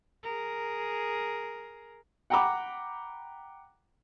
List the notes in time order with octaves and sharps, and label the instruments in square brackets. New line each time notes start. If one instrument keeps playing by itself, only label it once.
[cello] G#4 A#4
[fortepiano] F#5 G5 A#5 B5 D6